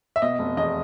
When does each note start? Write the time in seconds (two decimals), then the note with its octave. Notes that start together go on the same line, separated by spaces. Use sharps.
0.16 E5
0.22 B2 D#5
0.39 F1
0.57 E2 D#5